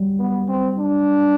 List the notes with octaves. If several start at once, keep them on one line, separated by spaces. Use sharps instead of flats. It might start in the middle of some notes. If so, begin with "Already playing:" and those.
Already playing: F#3 G3
B3
C4
D4